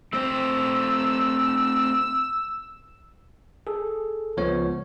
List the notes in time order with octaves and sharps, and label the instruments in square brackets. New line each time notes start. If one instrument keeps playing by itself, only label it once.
[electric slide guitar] A3 C4 C5 [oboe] E6
[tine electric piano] G#4 A4
C#2 F3 B3 C#5